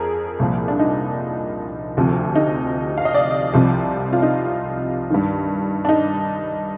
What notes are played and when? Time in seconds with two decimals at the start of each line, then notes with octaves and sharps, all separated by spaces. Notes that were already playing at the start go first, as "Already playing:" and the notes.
Already playing: F2 G#4 A#4
0.40 C2 A#2 F3
0.68 D4
0.79 D#4
1.97 D2 C3 F3
2.35 D#4
2.98 F5
3.05 D#5
3.14 D5
3.54 C2 C3 F3
4.13 F4
4.22 D#4
5.10 G2 D#3
5.85 D4
5.89 D#4